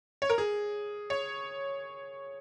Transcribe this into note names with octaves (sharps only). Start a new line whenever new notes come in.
C#5
A#4
G#4
C#5